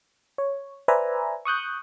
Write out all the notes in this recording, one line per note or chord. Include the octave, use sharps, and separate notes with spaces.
C#5
B4 C5 D5 E5 G#5 A#5
C#6 D#6 F#6 G6